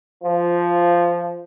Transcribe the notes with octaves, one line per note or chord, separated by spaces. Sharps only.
F3